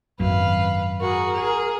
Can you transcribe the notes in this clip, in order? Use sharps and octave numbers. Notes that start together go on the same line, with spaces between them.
G#1 F#2 B4 F5
F#4 G#4 A#4
G#4